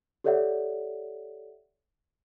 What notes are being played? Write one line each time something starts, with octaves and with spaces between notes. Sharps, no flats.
G4 A4 C#5 D5 E5 F#5